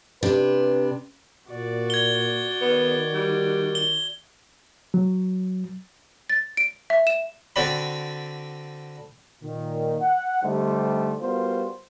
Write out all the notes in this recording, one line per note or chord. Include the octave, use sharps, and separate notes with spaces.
C3 D4 B4
A#2 F#4 D5
G#6 G7
D#3 B3
G3
G7
F#3
A6
D7
E5
E7
D3 C4 F#4 D5 B5
A#2 D#3
F#5
D3 G3 A3 D#4 G4 C5
G3 B3 F4 F#4 A#4 C5